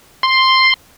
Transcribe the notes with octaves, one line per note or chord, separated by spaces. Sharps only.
C6